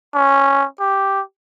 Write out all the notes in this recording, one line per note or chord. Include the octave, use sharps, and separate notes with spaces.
C#4
G4